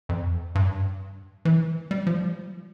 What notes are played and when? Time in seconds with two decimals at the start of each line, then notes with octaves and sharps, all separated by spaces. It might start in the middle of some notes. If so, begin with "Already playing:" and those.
0.09 F2
0.55 G2
1.45 E3
1.91 G3
2.07 F3
2.14 G3